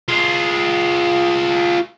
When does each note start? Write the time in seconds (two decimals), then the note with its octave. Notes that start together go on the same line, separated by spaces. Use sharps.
0.08 F4 G#4